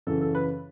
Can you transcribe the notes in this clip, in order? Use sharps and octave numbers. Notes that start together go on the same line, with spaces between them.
F#2 C#3 E3 A4
A4
B4